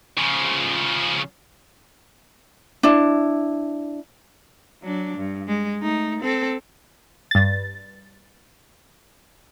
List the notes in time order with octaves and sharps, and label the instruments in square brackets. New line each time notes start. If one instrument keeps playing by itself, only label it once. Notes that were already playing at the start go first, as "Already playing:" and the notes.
[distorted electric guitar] C#3 F3
[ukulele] D4 E4
[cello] F#3 D4
G2
G#3
A3 D#4
C4 A4
[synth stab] G2 A6